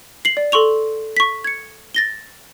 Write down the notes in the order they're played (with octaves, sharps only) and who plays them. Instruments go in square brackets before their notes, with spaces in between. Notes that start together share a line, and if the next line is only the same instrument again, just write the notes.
[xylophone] C7 F#7
D5
A4 C6 C#6 F7
C#6 B6
G#6 C#7
A6 A#6 G7